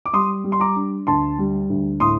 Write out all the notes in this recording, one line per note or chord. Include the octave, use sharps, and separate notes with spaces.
D6
G3 C6 D#6
G3
C6
A#5 D6
D4
D2 A5 C6
G3
D2
A2 C6 D#6